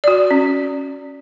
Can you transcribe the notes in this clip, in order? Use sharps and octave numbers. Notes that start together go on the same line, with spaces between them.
F#4 D5
C#4